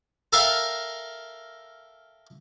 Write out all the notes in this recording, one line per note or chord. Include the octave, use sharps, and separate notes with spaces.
A4 A#4 E5 F5 G5 A#5